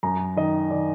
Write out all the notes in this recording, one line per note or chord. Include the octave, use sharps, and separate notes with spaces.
F#2 A#5
D#3 D#5
D#3 D5